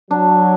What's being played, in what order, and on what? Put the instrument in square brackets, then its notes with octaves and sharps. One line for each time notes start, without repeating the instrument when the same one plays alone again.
[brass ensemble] F#3 [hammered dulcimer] D4